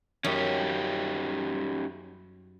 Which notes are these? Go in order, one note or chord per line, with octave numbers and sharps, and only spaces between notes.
F#2 C#4 D#4 G4